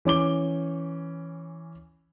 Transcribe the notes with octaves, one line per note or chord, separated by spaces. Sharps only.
E3 C#4 D6 G7